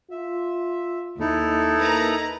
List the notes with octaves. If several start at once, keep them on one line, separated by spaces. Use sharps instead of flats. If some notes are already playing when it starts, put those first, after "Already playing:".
F4 E5
D#2 D#4 E4 A4
A#3 B4 A#5